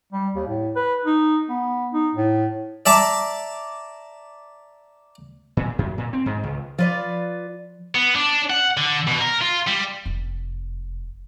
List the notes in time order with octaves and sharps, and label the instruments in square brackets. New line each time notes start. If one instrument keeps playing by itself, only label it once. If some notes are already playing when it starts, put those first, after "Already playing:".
[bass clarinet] G3
D#2
A2
B4
D#4
B3
D#4
A2
[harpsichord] D5 E5 A5 A#5 D6
[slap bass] A#2
F#2
A#2
C4
G#2
C#2
[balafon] F3 [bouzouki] F4 B4 D5
[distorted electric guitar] B3
D4
F#5
D3
B2
A#4
F4
G3
[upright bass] F1